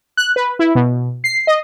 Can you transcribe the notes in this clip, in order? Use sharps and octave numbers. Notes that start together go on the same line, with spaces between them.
F#6
B4
E4
B2
C7
D#5